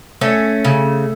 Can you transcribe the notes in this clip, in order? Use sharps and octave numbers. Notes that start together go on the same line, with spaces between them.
A3 C#4
C#3